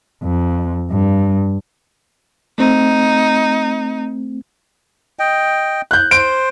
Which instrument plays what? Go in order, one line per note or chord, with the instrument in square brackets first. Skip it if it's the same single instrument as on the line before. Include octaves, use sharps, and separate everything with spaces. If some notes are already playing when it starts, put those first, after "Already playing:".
[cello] F2
G2
[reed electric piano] A3 C4 [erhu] D#4
[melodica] D#5 G5
[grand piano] F#6 G6
[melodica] C5 [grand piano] D7